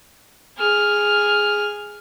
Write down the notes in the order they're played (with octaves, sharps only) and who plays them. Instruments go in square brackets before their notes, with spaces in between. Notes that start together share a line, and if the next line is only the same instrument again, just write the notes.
[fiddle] G#4 F6